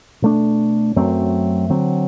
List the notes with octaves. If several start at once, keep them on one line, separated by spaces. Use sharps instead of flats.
B2 A3 D4
F#2 F#3 A3 C4
D3 F#3 C4